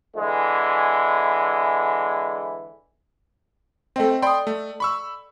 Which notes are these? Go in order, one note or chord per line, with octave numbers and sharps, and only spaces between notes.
D3 E3 G#3
A3 C4 A4 D#5 G5
D5 G5 B5 C6 D#6
A3
B5 C#6 E6